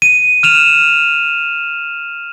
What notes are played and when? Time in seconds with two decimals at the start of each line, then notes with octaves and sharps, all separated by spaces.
0.02 D#7
0.43 F6 E7 F7